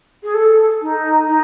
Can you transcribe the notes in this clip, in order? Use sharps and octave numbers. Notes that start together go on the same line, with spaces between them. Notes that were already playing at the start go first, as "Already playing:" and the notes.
G#4
A4
D#4
D#4